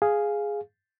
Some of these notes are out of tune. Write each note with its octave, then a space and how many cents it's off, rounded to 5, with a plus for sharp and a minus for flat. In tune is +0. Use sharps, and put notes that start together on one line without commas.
G#4 +0 F5 +0